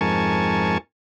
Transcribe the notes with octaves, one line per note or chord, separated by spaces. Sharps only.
F2 G#2 A#4 G#5 A5 C#6